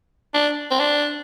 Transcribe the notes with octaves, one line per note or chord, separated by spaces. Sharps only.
D4
C4
D4